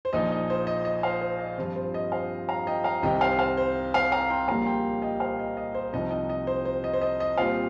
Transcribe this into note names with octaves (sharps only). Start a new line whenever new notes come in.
C5
A#1 A#2 F3 D#4 D#5
D#5
C5
D#5
D#5
C5 F5
C5
D#5
G2 F3 C4 F4
C5
D#5
C5 F5
F5 A#5
D#5 G5
F5 A#5
C2 C3 D#3 D#5 G5
C5 F5
C5 F5
C5
C5 F5
F5 A#5
G5 C6
A#1 A#2 G3 A#3 F5 A#5
G5 C6
D#5 G5
C5 F5
D#5
D#5
C5
C2 C3 F3 D#4 D#5
D#5
D#5
C5
C5
D#5
C5
D#5
D#5
A#2 G3 C4 F4 C5 F5